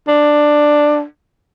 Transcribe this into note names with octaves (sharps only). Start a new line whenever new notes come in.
D4